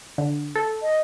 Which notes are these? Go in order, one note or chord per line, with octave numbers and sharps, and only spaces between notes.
D3
A4
D#5